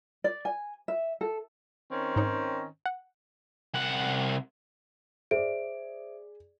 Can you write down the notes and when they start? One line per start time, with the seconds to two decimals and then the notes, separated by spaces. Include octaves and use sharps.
0.24 D5
0.45 G#5
0.88 E5
1.21 A4
1.91 D#3 C4 C#4
2.16 G#2 D#4 C#5
2.86 F#5
3.74 C2 F#5
5.31 G#4 C5 D5 E5 D7